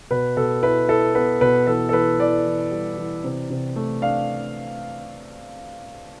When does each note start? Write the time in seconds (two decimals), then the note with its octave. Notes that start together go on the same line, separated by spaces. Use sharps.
0.10 B2 B4
0.37 B2 A4
0.63 E4 B4
0.88 E4 A4
1.15 B3 B4
1.41 B2 B4
1.67 E3 A4
1.89 A4
1.93 E3 B4
2.19 E3 D5
2.46 E3
2.72 G3
2.98 E3
3.24 C3
3.50 C3
3.76 A3
4.02 D4 F5